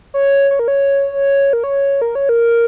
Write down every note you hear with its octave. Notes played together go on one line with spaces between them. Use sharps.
C#5
C#5
A#4
C#5
A#4
C#5
A#4
C#5
A#4